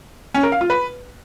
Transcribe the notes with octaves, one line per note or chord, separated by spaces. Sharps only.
C#4
A#4
F5
F4
B4